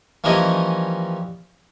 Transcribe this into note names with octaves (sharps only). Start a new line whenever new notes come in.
E3 F3 G3 A#3 C#4 D#5